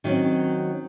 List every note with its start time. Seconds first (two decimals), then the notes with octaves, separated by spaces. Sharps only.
0.04 D#3 F#3 G3 C4 C#4